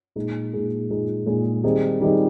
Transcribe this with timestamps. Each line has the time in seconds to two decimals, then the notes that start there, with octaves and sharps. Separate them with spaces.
0.16 A#2 G#3 D#4 G#4
0.53 A#2 G#3 D#4 G#4
0.90 A#2 G#3 D#4 G#4
1.26 A#2 G#3 D#4 G#4
1.64 D#3 G3 C4 D#4 G#4
2.01 D#3 G3 C4 D#4 G#4